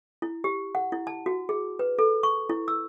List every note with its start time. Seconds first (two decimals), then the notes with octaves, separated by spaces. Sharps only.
0.22 E4
0.44 G4
0.75 F#5
0.92 E4
1.07 A5
1.26 F#4
1.49 G#4
1.79 B4
1.99 A4
2.23 C#6
2.49 E4
2.68 E6